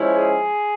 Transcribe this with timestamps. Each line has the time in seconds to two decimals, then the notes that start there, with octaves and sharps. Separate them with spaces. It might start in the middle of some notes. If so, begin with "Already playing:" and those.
Already playing: F3 G#3 C#4 E4
0.14 G#4